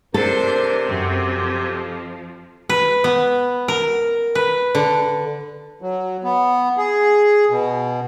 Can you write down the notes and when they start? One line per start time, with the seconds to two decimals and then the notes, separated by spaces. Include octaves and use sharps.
0.14 C3 D4 A4 A#4 C5
0.83 F#2 C4
1.35 F2 F3
2.69 B4
3.04 B3
3.68 A#4
4.35 B4
4.75 D3
5.82 F#3
6.24 B3
6.77 G#4
7.50 B2